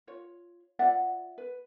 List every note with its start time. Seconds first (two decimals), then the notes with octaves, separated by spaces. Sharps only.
0.07 F4 C#5
0.79 F4 D5 E5 F#5
1.38 B4